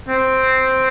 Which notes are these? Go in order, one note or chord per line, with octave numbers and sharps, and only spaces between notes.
C4